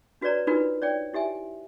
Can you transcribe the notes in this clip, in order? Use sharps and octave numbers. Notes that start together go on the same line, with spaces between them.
D4 F#4 B4 C#5 D5 A#5
D4 D#4 F4 F#4 A#4 B4
C#5 D5 G5
E4 G4 E5 G#5